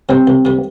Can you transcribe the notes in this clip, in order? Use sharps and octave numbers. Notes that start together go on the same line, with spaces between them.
C3 G3 C4
C2
C3 G3